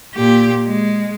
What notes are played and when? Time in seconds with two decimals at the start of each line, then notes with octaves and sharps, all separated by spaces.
0.15 A#2 G4
0.66 G#3